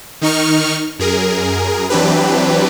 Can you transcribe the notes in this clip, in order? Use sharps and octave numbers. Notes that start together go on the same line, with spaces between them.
D#3 D#4 C#6 F6
F#2 G#4 A#4
E3 F#3 C4 D4 G4 B4